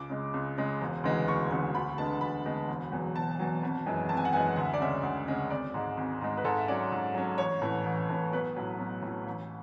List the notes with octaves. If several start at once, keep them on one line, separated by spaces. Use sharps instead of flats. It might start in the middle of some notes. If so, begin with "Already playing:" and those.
Already playing: C#2 D6
C#3 G#3
C#2
C#3 G#3
E1
D2 C#3 E3 G#3
E1 C#6
D2 C#3 E3 G#3
D2 B5
D3 G#3 B3 A5
D2 B5
D3 G#3 B3
E1
E2 B2 F#3
E1 A5
E2 B2 F#3
G#1
F#2 E3 G#3
G#1 A5
G#5
F#5
F#2 E3 G#3 G#5
D2 F#5
E5
D5
C#3 G#3 C#4 E5
D2
C#3 G#3 C#4
G#1 D5
G#2 G#3
G#1
G#2 G#3
B4
G#2 A4
E5
F#3 C#4 D5
G#2
F#3 C#4
A1 C#5
A2 E3
A1
A2 E3
B1 B4
A2 F#3
B1
A2 F#3
A1